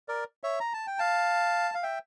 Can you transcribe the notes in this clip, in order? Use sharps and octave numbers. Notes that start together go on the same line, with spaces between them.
A#4 D5
C#5 E5
A#5
A5
G5
F5 A5
F5
E5 G5